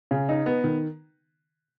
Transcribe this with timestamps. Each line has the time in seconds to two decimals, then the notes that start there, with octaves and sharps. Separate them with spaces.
0.11 C#3
0.29 D#4
0.46 B3
0.64 D#3